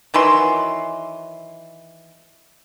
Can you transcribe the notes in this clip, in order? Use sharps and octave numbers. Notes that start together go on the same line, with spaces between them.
D#3 E3 F#3 C6